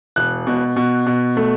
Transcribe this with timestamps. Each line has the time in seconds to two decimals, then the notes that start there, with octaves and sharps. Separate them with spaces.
0.16 E1 F#6
0.47 B2
0.76 B2
1.06 B2
1.37 A3